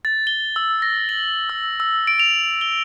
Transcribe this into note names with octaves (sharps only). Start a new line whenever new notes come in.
A6
G7
E6
A#6
F#7
E6
E6
D7
F7
G7